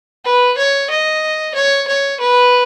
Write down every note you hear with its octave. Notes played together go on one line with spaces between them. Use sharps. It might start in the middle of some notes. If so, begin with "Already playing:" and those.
B4
C#5
D#5
C#5
C#5
B4